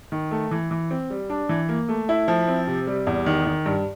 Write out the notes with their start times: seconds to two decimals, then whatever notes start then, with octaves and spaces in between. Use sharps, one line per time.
0.12 D#3
0.31 A3
0.51 E3
0.71 E3
0.91 C4
1.10 G3
1.30 D4
1.49 E3
1.69 A#3
1.89 A3
2.09 E4
2.28 F3
2.48 C4
2.67 C3
2.87 G3
3.07 E2
3.26 D#3
3.46 D#3
3.66 G2